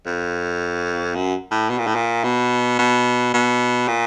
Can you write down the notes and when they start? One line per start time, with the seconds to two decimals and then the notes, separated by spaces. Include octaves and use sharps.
0.06 F2
1.15 F#2
1.51 A2
1.69 B2
1.78 A#2
1.87 A2
1.95 A#2
2.24 B2
2.79 B2
3.34 B2
3.88 A#2